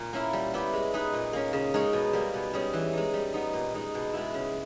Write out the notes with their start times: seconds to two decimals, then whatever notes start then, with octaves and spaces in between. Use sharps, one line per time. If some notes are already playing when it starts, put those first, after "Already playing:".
Already playing: A#2
0.13 A#3 C#4 E4 A#4
0.33 G3
0.53 B3 E4 G4
0.73 G#3
0.94 D#4 G#4 B4
1.14 A#2
1.33 A#3 C#4
1.53 C#3
1.74 G#3 D#4 A#4 C#5
1.93 B2
2.13 G3 A#3
2.34 B2
2.54 G3 C#4 G#4
2.73 E3
2.93 G#3 D#4
3.14 G3
3.34 B3 D#4
3.54 A#2
3.74 G#3 D#4
3.95 B2
4.13 G#3 B3 E4
4.34 C#3